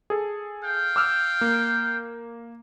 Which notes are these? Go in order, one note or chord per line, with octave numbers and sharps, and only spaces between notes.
G#4 A4
F5 G5
D6 E6 F6
A#3